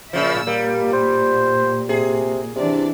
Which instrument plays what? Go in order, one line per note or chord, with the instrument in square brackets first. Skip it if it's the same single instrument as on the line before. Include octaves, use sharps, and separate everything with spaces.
[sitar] A#2 C#3 F3 [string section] E5 E6
[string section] A#2 [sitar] G3 [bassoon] A#3
[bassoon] C5
[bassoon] C3 [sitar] G#4
[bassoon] C3 [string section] E3 D4 D5